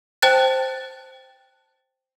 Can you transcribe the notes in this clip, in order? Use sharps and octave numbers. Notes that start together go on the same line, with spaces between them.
C5 G5 A5 F#6 A6